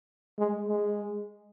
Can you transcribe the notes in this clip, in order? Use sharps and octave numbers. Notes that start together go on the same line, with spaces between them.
G#3
G#3